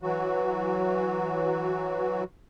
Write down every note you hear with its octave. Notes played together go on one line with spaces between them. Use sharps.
E3 F#3 F#4